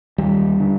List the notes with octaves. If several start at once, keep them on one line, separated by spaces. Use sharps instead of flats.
D#2 G3
D3